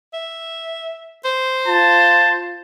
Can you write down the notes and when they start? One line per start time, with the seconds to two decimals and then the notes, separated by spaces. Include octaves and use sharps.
0.13 E5
1.25 C5
1.68 F4 A5